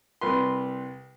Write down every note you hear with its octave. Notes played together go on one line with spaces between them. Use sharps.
C2 B4 C6